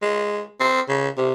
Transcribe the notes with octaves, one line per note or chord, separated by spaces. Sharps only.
G#3
C4
C#3
C3